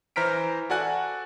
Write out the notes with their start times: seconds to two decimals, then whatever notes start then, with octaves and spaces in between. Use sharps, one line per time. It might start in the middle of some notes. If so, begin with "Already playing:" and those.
0.16 E3 C5 A#5 F6 B6 D7
0.70 F#4 A4 D5 F#5 G#5 F#6